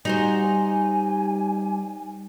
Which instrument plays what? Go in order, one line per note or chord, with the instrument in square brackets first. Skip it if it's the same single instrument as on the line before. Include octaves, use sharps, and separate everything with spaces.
[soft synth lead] G3 [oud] D#4 F#4 C5 [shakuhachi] G#5